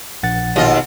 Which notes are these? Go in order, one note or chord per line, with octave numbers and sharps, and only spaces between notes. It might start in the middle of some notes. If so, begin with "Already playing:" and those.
A#1 F#5 A6
D#2 B2 F4 D#5